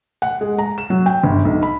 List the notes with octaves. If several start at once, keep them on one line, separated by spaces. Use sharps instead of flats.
F#5
G#3
A#5
E7
F#3
G5
G1
B1
B5